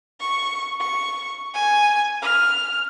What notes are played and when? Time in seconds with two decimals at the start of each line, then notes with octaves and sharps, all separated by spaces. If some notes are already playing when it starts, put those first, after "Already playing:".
0.21 C#6
0.81 C#6
1.54 G#5
2.22 F6